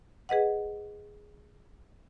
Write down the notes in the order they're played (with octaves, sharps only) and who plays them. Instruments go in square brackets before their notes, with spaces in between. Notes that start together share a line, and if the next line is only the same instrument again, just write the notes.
[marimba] G#4 B4 D#5 F#5